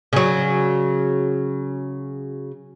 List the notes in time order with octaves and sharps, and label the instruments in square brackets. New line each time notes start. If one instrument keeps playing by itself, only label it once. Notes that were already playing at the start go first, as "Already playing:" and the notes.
[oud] C#3 F#3